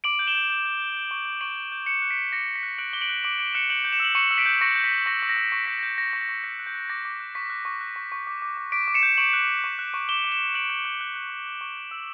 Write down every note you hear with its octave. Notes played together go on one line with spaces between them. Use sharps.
D6 D7 F#7
G6
E7 G7
G6
G6
G6
G6
G6
C#6
G6
C#6 D7 F#7
G6
G6
F#6 C#7 E7
F#6
B6 D7
F#6
D6 A#6 C#7
D6
B6
F#6
F#6 D7 F#7
D6 G7
D7 F#7
F#6
D6 D7 F#7
D6 B6 D7
F#6 C#7 E7
G6 D7 F#7
G6
C#7 E7
E6 F#7
C#6 C#7 E7
E6
B6 D7
G6
C#6 A#6 C#7
G6
B6
G6
C#6 A#6
C#6
A#6
E6
C#6 A#6
G6 B6
A#6
G6
G6 A#6
C#6
A#6
C#6
F#6 B6
F#6
G6
F#6
D6 A#6
D6
F#6
C#6 B6
F#6
C#6
F#6
C#6
C#6
D6
D6
D6
D6 B6 D7
D6
C#7 E7
G6
C#6 D7 F#7
F#6
F#6
C#6
F#6
C#6
D6 E7 G7
D6
E7 G7
D6
F#6 D7 F#7
F#6
F#6
F#6
F#6
C#6
F#6
C#6
F#6
E6